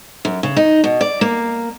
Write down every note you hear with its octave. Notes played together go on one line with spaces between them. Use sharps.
F#2
C#3
D#4
B2
D5
A#3